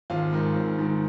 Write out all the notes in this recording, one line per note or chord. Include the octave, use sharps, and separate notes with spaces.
G#1 F4
G#2 D#3
G#1
G#2 D#3